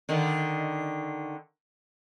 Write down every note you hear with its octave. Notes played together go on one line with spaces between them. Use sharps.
D3 D#3